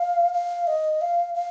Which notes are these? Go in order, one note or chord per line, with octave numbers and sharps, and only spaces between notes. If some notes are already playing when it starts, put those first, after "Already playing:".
Already playing: F5
F5
D#5
F5
F5